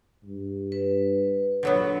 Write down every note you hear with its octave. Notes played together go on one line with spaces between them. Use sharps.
G2
B4
A#1 D3 F#3 B3